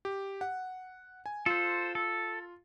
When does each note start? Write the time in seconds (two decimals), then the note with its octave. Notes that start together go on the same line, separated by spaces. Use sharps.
0.05 G4
0.41 F#5
1.26 G#5
1.46 F4 A4 C5
1.95 A4